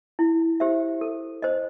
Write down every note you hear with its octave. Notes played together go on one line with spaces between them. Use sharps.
E4
G4 C5 E5
A4
C5 D#5